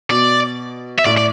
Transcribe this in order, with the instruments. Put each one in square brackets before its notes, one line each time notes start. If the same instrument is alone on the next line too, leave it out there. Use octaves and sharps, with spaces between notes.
[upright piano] B2 [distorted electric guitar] D5
[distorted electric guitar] E5
[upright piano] A2 [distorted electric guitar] D5
[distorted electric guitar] D5